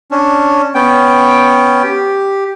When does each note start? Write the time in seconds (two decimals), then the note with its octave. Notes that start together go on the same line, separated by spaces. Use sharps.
0.11 C#4 D4
0.74 B3 C#4 G5
1.84 G4